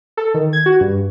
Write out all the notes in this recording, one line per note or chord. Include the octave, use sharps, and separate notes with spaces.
A4
D#3
G#6
F#4
G2